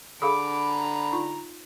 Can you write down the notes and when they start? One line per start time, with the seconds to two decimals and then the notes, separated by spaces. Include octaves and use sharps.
0.22 D3 G#4 A4 F5 B5 D6
0.72 A#5
1.12 D#4 F4